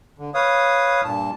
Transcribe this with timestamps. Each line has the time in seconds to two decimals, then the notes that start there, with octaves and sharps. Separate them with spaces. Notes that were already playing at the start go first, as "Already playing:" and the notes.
0.18 D3
0.34 B4 C#5 F5 D#6
1.04 G2 A#2 A5